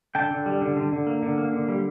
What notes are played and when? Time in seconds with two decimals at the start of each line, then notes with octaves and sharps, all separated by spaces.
0.15 D3 G5 A5
0.31 D3
0.46 G3
0.62 D3
0.77 D3
0.92 D3
1.07 A#3
1.23 D3
1.38 A#3
1.53 D3
1.68 G3